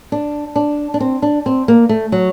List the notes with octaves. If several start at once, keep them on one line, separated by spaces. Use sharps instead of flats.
D4
D4
D4
C4
D4
C4
A#3
A3
F#3